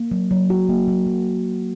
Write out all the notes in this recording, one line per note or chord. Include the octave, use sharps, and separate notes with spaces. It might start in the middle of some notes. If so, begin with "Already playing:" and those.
Already playing: A#3
F#3
F#3
F#4
A#3
F#3
F#3